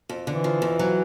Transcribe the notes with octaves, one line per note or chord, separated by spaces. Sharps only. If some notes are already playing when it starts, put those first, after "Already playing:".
F2
D3 E3
F3
F2
F#3